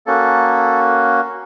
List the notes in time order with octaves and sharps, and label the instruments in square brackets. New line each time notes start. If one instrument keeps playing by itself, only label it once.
[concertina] A#3 C#4 F#4 A4